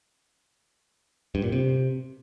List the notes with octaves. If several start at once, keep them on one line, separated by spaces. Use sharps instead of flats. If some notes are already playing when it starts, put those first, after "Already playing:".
G2
A#2
C3